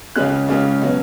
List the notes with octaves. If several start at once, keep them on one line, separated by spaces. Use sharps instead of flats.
C#2 C#3 G#3 C#4 F#6
C#2 C#3 G#3 C#4
B2 F#3 C#4